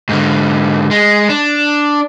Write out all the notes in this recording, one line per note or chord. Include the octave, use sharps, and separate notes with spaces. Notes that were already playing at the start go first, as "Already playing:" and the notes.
G#2 D3
G#3
D4